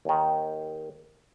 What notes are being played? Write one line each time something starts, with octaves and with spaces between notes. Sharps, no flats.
D#2 D#3